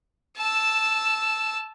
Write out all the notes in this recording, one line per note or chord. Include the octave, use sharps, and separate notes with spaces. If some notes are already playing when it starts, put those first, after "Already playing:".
A5 E6